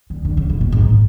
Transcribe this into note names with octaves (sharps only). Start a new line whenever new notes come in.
D3
D3
C#3
B2
B2
G#2